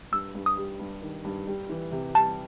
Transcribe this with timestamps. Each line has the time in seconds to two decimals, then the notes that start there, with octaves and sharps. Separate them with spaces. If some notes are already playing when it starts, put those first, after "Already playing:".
0.12 G2 E6
0.35 G2
0.46 D#6
0.57 G3
0.79 G2
1.02 D#3
1.24 G2
1.47 G3
1.69 E3
1.92 C3
2.14 G3 A5